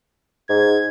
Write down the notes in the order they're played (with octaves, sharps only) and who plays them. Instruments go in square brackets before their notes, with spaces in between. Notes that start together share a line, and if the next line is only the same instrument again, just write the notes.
[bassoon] G#2 [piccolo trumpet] G#6